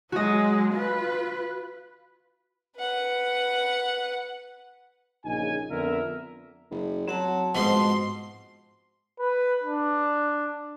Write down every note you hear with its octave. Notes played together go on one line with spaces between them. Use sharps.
F#3 G#3 F#4 D#5
F4 B4
B4 F#5
A#1 C#3 D#4 G#5
F2 D3 B3 A#4 E5
F#1
F#3 C4 F#5 A5
G#2 B2 F3 C6
B4
D4